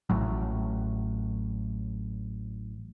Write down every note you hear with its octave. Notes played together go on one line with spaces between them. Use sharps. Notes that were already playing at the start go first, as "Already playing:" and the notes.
A1 A2 F#3